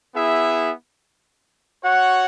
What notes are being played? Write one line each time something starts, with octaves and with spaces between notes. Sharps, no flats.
B3 E4 G#4 E5
F#4 C#5 F#5